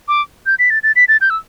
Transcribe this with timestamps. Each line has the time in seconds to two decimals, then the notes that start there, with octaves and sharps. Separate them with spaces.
0.08 D6
0.46 G6
0.59 B6
0.70 A6
0.83 A6
0.96 B6
1.08 A6
1.21 G6
1.30 E6